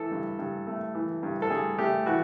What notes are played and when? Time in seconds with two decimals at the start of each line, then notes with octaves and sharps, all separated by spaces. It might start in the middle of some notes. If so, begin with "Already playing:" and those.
Already playing: E3 A3 A4
0.12 G2
0.39 G2
0.67 A3
0.95 E3
1.23 G2
1.42 A4
1.50 G2 G#4
1.79 A3 G4
2.06 E3 F#4